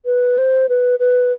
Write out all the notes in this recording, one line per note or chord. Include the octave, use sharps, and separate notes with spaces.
B4
C5
B4
B4